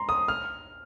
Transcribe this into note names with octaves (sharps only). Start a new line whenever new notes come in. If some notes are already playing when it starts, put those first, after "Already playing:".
Already playing: A#5 C6
D#6
F6